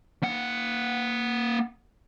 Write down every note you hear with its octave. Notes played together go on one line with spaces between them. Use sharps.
A#3 F#5